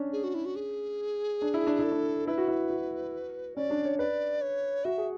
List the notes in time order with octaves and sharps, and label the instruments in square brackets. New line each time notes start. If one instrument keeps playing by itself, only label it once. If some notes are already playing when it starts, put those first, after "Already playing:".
Already playing: [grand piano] C#4 D4
[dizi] G#4
F#4
E4
F#4
G#4
[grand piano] D4
E4
D4
[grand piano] E4 [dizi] A4
[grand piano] D4
[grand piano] E4 [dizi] B4
[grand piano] F#4
E4
F#4
[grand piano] C#4 [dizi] D5
[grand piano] D4
C#5
[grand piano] B4 [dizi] D5
[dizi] C#5
[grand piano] F#4 [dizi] E5
[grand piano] G#4